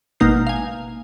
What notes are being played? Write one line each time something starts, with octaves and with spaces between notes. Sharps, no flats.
G#1 B2 A#3 D#4 G6 C7
F5 G#5